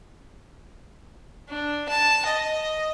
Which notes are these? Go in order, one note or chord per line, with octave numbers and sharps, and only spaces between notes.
D4
A5
D#5